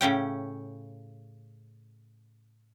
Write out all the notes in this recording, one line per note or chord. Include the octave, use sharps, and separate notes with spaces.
A2 C#3 C#4 G5